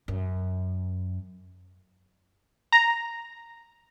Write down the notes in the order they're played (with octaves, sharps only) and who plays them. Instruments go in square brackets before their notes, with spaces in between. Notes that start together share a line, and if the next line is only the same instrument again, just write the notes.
[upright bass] F#2
[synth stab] A#5